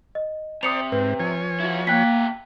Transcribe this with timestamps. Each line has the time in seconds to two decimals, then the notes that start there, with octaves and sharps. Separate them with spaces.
0.15 D#5
0.63 C3 C5 D5 D#6 C#7 F7
0.92 G#2 C4 B4
1.20 F3 C#5 G#5
1.60 E4 F#4
1.87 B2 A#3 G5 F#6 B6